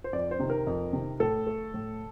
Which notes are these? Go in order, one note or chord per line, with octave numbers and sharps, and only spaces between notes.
C5
F2 D5
C5
C3 D#3
A#4
F2
C3 D#3
A2 A4
A3
A2